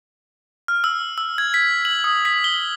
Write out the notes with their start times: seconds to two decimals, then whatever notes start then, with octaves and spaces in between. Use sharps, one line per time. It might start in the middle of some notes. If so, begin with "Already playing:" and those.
0.68 F6
0.84 E6
1.18 E6
1.38 G#6
1.54 B6
1.85 F#7
2.04 D#6
2.25 B6
2.44 G7